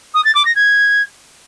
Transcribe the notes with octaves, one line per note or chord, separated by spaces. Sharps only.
D#6
A6
D6
A#6
G#6